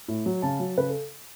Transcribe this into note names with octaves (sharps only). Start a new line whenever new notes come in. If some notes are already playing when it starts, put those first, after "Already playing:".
A2
F#3
C#3 A5
F#3
C#3 B4
A4